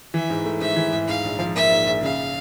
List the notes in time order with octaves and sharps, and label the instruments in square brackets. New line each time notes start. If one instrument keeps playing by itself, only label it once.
[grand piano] E3 [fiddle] E5
[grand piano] G#2
A3
[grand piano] G#2 [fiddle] E5
[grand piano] E3
G#2
[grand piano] G#2 [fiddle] F5
[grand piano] A#1
F3
[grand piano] A#3 [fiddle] E5
[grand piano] G#2
A#1
[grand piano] C#3 [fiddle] F5